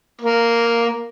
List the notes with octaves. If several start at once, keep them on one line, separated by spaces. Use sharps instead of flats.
A#3